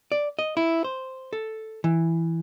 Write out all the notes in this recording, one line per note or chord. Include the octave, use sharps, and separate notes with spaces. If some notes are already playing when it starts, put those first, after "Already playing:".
D5
D#5
E4
C5
A4
E3